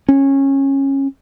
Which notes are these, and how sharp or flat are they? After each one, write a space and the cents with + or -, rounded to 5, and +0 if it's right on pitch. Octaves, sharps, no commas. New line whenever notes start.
C#4 -20